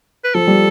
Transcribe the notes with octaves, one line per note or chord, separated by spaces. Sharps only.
B4
F3 A4
G3